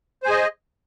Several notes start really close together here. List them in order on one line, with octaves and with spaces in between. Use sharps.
C5 G#5 G#4 D#5